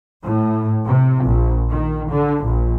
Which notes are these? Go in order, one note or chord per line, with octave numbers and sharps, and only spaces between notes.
A2
C3
A#1
D#3
D3
A#1